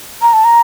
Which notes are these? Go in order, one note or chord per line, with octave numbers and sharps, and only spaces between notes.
A#5
A5
A#5